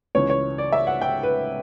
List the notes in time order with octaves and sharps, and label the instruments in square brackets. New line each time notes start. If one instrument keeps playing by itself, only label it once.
[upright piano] C#2 C#3 E3 C#5
C#5
D5
E5
F#5
G5
B4